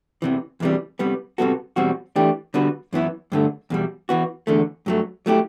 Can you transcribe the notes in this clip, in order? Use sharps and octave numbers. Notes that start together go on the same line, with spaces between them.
E2 C3 E3
E2 C3 E3 G3
C3 G3 B3
C3 G3 B3 F#4 A4
E2 B2 G3 C4 F#4
E3 A3 D4 G4
D3 G3 B3 F#4 B4
F#2 E3 B3 E4
G2 D3 A3
E2 B2 G3
E3 B3 F#4
E2 D3 A3
G2 F#3 A3
F#3 A3 E4 G4